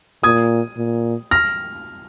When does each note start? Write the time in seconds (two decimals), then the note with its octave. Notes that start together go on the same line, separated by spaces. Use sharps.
0.23 A#2 D#6 G#6
0.78 A#2
1.31 F6 A#6